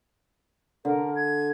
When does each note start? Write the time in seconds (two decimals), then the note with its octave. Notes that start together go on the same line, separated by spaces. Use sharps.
0.85 D3 A#4
1.16 G#6